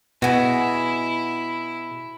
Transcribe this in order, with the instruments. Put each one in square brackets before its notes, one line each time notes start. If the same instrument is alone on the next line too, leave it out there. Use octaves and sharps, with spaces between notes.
[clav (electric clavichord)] B2 [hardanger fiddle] E4 [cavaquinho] F#4 G#4